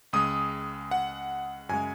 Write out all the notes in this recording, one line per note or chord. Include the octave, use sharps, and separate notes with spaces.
C#2 C#3 G#3 D#6
F#5
F#2 C#3 G#3 G#5